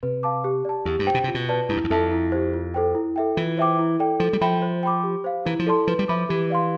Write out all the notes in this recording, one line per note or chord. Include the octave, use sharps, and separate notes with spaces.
C3 B4
F5 A5 D6
G4
D5 A5
E2 G4
G2
C5 G5
B2
C3 F4
B2
B4 D5 A5
G2 E4
F2
E2
F2 A4 E5 A5
E4
G4 C5
F4
A4 C5 G5
E4
A4 E5 G5
E3 F4
C5 E5 G5 D6
E4
A4 D5 G5
F3 A4
G3
F3 E5 G5 B5
C5
G5 B5 D6
G4
C5 F5
E3 E4
F3
A4 D5 A5 C6
F3 B4
G3
F3 E5 B5 D6
E3 G4
D5 F5 C6